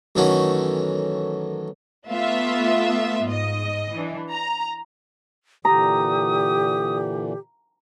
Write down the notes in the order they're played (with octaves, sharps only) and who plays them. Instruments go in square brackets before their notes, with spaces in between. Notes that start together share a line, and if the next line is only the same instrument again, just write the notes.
[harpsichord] F#2 D#3 E3 A3 C#4 F#4
[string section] A3 B3 F4 E5
G#2 D#5
E3 D4
A#5
[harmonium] A#2 D3 E3 [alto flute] G4 [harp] A#5 [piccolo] D#6